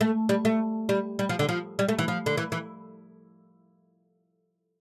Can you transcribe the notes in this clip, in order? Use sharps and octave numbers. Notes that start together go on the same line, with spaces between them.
A3
G3
A3
G3
G3
F3
D3
F3
G3
A3
E3
F3
D3
E3
E3